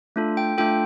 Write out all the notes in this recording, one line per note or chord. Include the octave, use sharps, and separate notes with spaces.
A3 D4 F4 A4
G5
A3 D4 F4 A4 G5